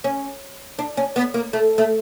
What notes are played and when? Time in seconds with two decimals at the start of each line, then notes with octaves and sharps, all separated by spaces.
0.04 C#4
0.79 D4
0.97 C#4
1.16 B3
1.34 A#3
1.53 A3
1.78 A3